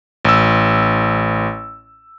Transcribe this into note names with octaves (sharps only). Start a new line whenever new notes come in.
A1 E6